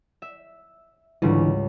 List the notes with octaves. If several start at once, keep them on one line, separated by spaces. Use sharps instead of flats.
E5
C#2 G#2 D3 E3 G3